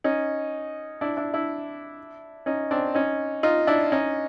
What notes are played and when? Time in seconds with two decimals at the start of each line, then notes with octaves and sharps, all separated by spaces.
0.04 C#4 D#4
1.01 D4 E4
1.17 D4 E4
1.34 D4 E4
2.46 C#4 D#4
2.71 C4 D4
2.95 C#4 D#4
3.43 D#4 F4
3.67 D4 E4
3.92 C#4 D#4